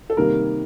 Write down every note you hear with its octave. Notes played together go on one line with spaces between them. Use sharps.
A4
C3 D#3 G3 A#3 A#4